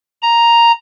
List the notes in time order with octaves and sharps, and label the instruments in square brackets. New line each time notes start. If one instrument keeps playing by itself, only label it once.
[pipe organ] A#5